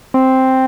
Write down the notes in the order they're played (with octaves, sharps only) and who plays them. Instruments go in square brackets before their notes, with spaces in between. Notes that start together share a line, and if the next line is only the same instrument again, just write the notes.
[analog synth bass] C4